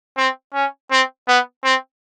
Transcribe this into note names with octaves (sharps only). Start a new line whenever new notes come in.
C4
C#4
C4
B3
C4